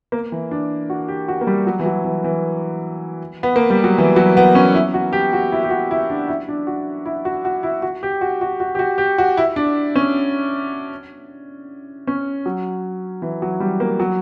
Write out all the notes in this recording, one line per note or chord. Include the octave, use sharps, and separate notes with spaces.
A#3
E3
D4
F#4
G4
F#4
A#3
G3
F#3
E3
F#3
E3
E3
B3
A#3
G3
F#3
E3
F#3
B3
C#4
E4
F#4
G4
F#4
E4
G4
F#4
E4
D4
E4
D4
F#4
E4
F#4
F#4
E4
F#4
G4
F#4
F#4
F#4
G4
F#4
G4
F#4
E4
D4
C#4
C#4
F#3
E3
F#3
G3
A#3
F#3